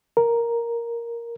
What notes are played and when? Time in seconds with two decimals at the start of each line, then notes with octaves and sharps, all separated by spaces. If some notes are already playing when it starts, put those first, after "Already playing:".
0.17 A#4